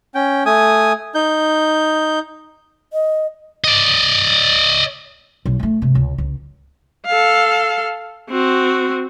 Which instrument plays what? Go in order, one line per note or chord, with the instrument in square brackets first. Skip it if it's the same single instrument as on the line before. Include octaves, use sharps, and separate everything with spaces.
[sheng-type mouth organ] C#4 G5
A3 G#5 D#6
D#4 G6
[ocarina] D#5
[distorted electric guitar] D5 D#5
[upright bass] B1
G#3 A3
G#2 C3
C#2
C#2
[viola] A4 F5
C4 F#4